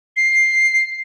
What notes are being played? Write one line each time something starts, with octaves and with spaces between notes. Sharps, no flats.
C7